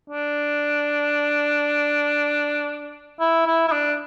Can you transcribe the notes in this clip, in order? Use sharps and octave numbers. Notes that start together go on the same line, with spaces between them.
D4
E4
E4
E4
D4